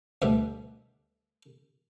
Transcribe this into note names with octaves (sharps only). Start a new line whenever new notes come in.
D2 G2 B2 E5